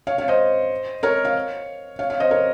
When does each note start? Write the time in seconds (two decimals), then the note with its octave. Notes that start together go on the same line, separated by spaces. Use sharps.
0.07 C#5 F5
0.18 C#5 F5
0.28 C5 D#5
1.03 A#4 C#5
1.24 C#5 F5
1.99 C#5 F5
2.10 C#5 F5
2.20 C5 D#5
2.31 A#4 C#5